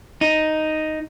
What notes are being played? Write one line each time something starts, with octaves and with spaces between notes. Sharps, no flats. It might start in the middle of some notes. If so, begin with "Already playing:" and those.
D#4